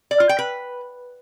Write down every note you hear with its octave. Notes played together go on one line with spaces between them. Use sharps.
D5
F4
G5
B4